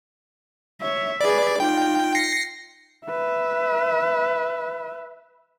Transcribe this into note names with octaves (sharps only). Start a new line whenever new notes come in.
C#5 E5
G#4 B4 D5
D#4 F4 G5
A#6 C7 C#7
B4 E5